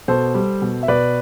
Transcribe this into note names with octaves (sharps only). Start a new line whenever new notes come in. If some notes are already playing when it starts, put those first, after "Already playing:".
B2 A4 C5
G3
B2
E5
B2 B4 D5